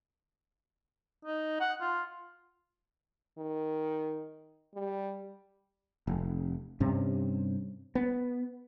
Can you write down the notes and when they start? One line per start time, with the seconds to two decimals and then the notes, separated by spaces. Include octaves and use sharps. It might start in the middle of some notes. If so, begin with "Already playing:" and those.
1.25 D#4
1.61 F#5
1.81 F4
3.38 D#3
4.74 G3
6.07 F1
6.80 G2 C3 C#4
7.95 B3